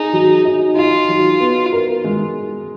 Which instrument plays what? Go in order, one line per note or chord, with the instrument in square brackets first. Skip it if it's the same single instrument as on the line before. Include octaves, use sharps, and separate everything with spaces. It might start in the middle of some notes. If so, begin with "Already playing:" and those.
Already playing: [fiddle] D#4 [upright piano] G#4
[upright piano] F#3
D#4
[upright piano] D#4 [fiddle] F4
[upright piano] F#3
B3
A#4
G#3